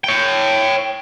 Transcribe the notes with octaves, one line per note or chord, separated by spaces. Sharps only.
C#5 G5